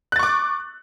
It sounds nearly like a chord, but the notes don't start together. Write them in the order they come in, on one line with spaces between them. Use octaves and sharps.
F#6 A6 C#6 D6